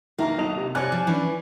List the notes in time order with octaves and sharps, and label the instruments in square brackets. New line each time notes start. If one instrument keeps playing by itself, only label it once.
[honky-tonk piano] D#3 E4 A#5 [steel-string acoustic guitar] A#3 D4
[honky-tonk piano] B1 D#5 F7
C3
[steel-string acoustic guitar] C3 C#5 [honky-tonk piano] D5 G#5 F#6
[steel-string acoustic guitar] F3
E3 C#4 D4